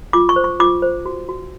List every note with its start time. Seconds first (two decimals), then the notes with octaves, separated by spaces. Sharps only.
0.13 F4 D6
0.29 C#6
0.36 C5
0.44 C#6
0.59 F4 D6
0.82 C5
1.06 F#4
1.29 F#4